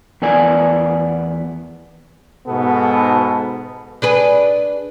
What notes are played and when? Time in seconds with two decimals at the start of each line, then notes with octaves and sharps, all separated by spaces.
0.22 E2 B3 A#4 D5 G#5
2.47 G#2 B2 B3 A4
4.02 D4 G#4 B4